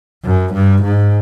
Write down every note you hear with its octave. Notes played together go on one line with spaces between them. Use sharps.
F#2
G2
G#2